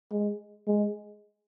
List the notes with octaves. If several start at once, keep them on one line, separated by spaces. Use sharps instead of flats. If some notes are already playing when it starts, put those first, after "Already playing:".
G#3
G#3